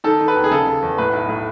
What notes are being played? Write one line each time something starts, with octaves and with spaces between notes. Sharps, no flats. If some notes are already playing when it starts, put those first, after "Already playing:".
D#3 A4
D#3
B4
D#2
G#4
C#3 A4
C#3
E2
A2 B4
B1
A2